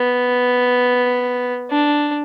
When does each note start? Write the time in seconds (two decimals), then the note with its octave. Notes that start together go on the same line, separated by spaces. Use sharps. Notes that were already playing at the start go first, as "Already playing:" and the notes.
Already playing: B3
1.71 D4